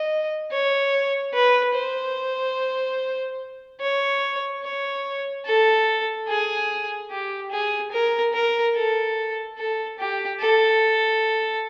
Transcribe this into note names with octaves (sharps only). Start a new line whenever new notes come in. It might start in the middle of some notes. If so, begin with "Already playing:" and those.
Already playing: D#5
C#5
B4
C5
C#5
C#5
A4
G#4
G4
G#4
A#4
A#4
A4
A4
G4
A4